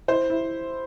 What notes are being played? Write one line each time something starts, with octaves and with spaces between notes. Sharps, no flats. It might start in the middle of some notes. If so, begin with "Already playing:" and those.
E4 C5
E4